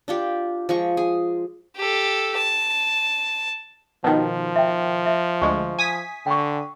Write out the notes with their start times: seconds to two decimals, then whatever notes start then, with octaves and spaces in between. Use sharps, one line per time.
0.08 D4 F4 G4
0.69 F3 G#3 C#6
0.97 G#4
1.76 G4 A4
2.38 A5
4.04 B2 D#3 F3 A5
4.56 E5 G5
5.06 E5
5.42 D2 G#3 C#6
5.79 G#5 D#6 B6
6.26 D3 G5 C#6